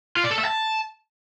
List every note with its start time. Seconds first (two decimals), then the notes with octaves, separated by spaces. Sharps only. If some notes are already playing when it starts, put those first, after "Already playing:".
0.17 F4
0.24 D5
0.31 A4
0.38 E5
0.45 A5